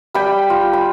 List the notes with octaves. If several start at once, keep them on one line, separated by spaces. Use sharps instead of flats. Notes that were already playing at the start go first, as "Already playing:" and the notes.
G3 G5 B5
F4
B5